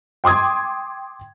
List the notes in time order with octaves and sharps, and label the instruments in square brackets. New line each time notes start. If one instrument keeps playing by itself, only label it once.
[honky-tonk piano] G5 C6 D6 D#6 G#6